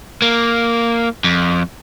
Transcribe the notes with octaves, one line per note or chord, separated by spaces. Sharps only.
A#3
F2